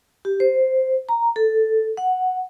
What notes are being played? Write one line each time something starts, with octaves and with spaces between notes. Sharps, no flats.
G4
C5
A#5
A4
F#5